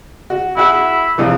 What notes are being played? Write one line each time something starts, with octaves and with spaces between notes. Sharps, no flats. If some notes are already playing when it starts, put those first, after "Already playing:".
F#4
E4 F#4 G#4 F#5
A#1 C3 E3